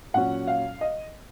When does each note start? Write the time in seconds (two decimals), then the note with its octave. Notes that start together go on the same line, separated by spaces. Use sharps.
0.14 A#2 F#3 C#4 F#5
0.47 F5
0.81 D#5